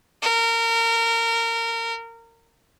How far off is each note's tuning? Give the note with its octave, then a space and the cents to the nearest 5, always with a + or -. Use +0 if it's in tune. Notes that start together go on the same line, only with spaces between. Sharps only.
A#4 -25